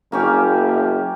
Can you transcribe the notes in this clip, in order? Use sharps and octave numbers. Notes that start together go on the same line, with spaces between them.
F#1 A#3 C#4 G4